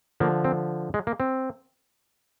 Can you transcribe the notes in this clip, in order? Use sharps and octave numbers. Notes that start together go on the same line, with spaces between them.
D3 F3 A#3
C4
G#3
A#3
C4